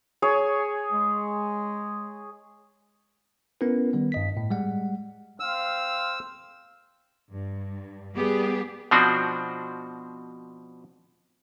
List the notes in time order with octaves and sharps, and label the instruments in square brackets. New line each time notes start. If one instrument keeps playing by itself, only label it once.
[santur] G#4 C#5
[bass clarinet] G#3
[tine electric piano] B3 C#4 E4 A#4 B4
D#3 G3 B3
G2 D#5 B6
A2
G3 G#3 F#5
[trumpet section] C4 F5 [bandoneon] E6
[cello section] G2
G3 B3 G4 G#4
[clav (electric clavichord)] B2 F3 C4 D4 F#4